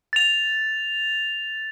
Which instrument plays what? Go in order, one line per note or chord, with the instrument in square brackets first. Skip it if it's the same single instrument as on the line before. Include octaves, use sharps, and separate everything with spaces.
[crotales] A6 F7